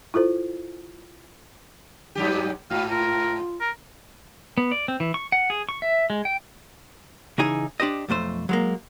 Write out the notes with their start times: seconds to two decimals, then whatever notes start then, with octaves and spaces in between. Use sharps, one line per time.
0.14 E4 F4 A4 C5
2.15 G2 F#3 G4
2.70 G#2 F#4 F5
2.90 F4 A#4
3.61 A#4
4.58 B3
4.72 D5
4.88 C4
5.00 E3
5.14 C#6
5.32 F#5
5.50 G#4
5.69 C#6
5.82 E5
6.10 G#3
6.25 G5
7.38 C#3 E3 D#4 G#4 G#5
7.80 D4 G4 C5 D#5
8.08 B1 F2 A3 C5
8.49 F#3 G#3 A#3